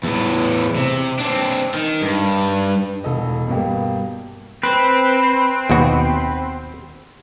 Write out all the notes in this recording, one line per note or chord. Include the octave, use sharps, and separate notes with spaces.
E2 A2
C3
C4 D4
D#3
G2
E1 A4 D#5
G2 B2 A#3 G4
C4 B4
D#2 B2 F#4